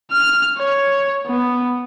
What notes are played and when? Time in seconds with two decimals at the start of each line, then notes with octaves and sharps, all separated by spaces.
0.11 F6
0.58 C#5
1.27 B3